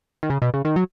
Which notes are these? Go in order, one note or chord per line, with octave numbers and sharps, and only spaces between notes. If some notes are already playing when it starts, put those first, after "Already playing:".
D#3
C#3
B2
C#3
D#3
F#3